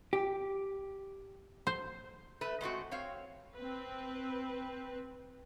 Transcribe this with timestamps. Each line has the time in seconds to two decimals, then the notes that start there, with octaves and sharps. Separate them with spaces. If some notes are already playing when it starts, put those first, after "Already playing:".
0.13 G4
1.67 C5
2.41 A3 B4 E5
2.61 G#3 A3 C4 F#4
2.91 C4 C#5 F5
3.55 C4 B4